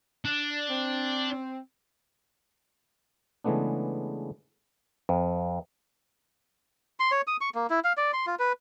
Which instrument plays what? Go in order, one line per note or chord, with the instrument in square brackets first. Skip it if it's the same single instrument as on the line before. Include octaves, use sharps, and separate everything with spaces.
[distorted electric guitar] D4
[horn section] C4
[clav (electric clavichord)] C#3 E3 G#3 A3 B3 D4
F2
[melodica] C6
C#5
D#6
C#6
A#3
E4
F5
D5
C6
F4
B4